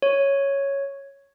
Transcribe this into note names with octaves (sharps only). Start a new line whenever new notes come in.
C#5